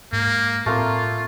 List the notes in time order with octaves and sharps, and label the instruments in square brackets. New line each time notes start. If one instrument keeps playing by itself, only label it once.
[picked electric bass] G#2 [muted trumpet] A#3
[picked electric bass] A2 C4 [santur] A3 A#3 C6 [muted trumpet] F4